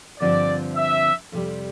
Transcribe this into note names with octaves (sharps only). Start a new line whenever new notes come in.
G2 D3 F3 C4 F4 D5
E5
F2 C3 G3